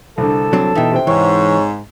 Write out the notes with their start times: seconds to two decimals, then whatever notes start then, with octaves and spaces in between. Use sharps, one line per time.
0.18 C2 D3 A4
0.53 F#3 C4 D4
0.75 B2 E3 D#4 E5 G5
0.92 C3 C4 G5
1.07 G#2 E3 C#5